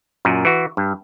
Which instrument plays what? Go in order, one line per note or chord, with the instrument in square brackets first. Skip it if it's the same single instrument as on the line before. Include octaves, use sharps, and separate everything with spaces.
[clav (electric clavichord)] F#2 A#2
E3 F#4
G2